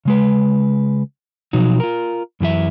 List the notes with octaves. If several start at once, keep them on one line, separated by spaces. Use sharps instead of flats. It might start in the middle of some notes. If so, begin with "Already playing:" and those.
C#3 G#3 B4
B2 F3 F#3 D#4
F4 A#4
F#2 E3 G4 E5